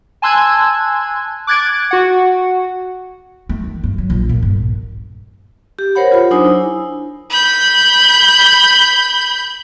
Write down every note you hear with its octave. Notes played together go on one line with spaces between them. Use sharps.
G#5 A5 C6 E6 F#6 G#6
D6 F#6 G#6 A6 D7
F#4 F#5
A3
D#3
G2
F#3
A#1
A#2
G2
G4
A#4 C5 C#5 F#5 B5
F4 B5
F#3 D4 D#4 C5 G#5 D#6
E4
B5 G6